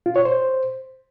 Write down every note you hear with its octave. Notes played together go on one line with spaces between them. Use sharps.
F4
C#5
C5